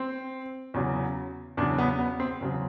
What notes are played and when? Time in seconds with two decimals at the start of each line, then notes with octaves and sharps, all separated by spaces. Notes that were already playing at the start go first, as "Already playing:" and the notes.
Already playing: C4
0.74 E2 C#3 F#3
1.57 E2 C#3 F#3 D4
1.78 B3
1.99 B3
2.20 C4
2.41 E2 C#3 F#3